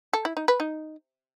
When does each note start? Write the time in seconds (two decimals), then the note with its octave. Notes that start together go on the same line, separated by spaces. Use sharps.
0.13 A4
0.25 E4
0.37 D#4
0.48 B4
0.60 D#4